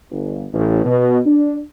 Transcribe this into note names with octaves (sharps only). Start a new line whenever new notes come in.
G1
A1
B2
D4